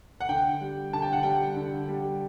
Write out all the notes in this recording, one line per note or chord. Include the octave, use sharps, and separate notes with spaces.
F#5
D3 G5
G3
D3 A5
G5
F#5
G3 G5
D3
G3